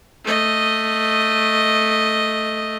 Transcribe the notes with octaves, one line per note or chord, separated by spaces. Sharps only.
A3 D#5